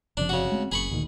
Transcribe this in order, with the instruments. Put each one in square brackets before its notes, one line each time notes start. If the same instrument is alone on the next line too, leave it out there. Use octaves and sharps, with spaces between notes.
[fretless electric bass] F#1 C3 F3 [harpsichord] D4
[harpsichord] C#3 F#4
[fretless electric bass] G#3 A3 C4
[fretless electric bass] F#1 F#2 [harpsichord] G#4 B5 C#6
[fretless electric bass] D2 A#2 D#3